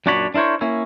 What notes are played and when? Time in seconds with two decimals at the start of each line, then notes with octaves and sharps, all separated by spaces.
0.06 F#2 A#2 D4 F#4 C#5 B5
0.34 D4 E4 A#4 C5 C#5
0.61 A#3 C#4 E4